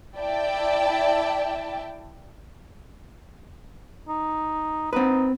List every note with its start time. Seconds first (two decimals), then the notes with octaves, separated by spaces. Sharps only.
0.16 E4 D5 E5 G5 A5
4.08 D#4
4.93 C4 D#4 B4